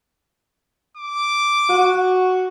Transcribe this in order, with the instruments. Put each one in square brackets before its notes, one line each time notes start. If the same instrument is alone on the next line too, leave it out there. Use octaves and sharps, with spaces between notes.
[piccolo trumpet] D6
[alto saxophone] F#4